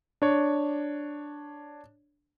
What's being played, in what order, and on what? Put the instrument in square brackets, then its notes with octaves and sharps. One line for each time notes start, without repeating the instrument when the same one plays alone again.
[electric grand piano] D4 C#5